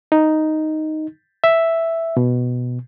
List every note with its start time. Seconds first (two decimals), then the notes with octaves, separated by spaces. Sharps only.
0.12 D#4
1.44 E5
2.17 B2